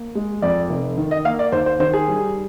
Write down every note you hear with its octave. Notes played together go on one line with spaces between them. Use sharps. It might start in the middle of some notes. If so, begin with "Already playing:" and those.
Already playing: A#3
G#3
F2 D5
F1
D#3
D#5
A#3 F5
D5
D#2 C5
C5
D#3 C5
G#4
G3